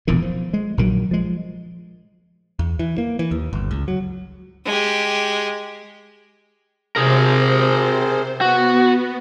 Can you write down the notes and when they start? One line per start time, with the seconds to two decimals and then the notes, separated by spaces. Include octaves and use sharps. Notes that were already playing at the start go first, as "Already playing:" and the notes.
0.07 E1 E2 A#2 D#3
0.22 F3
0.53 G#3
0.77 A#1 D#3 F#3
1.11 F3 G#3
2.59 E2
2.79 E3
2.98 A#3
3.19 E3
3.31 D#2
3.53 G1
3.71 C#2
3.88 F#3
4.66 G#3 G4
6.96 C3 G#4 A#4 C5
8.41 B3 F#4